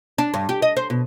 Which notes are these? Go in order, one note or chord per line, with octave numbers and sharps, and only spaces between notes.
D4
G2
G4
D#5
C5
B2